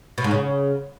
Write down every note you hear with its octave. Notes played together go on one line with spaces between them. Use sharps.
B2
G#2
C#3